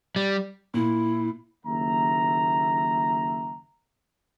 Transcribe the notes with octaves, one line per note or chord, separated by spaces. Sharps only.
G3
A#2 E4
F#1 D#2 E5 A#5